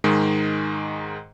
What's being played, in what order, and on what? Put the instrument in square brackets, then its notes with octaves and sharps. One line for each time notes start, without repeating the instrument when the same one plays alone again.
[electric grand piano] G#2 D#3 G#3